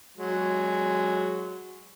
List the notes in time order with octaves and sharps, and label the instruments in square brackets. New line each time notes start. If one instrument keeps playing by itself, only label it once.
[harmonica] F#3 G#3